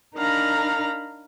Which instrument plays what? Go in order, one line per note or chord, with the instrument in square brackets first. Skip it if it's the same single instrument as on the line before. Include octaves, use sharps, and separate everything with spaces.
[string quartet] D4 D#4 A#4 F5 A#5 B5